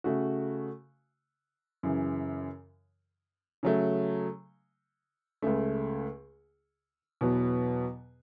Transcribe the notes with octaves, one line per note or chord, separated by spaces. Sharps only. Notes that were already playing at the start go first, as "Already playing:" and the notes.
C#3 A3 F#4
F#2 C#3 E3
C#3 F#3 A3
C#2 C#3 A3
E2 B2 F#3 B3